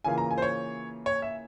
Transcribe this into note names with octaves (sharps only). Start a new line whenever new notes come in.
C#3 E3 A#3 F4 G#5
A#5
G#5
C5
C#5
C#5
E5